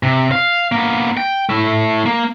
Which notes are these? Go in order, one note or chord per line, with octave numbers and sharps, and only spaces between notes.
C3
F5
A#3 B3
G5
A3 E4
A#3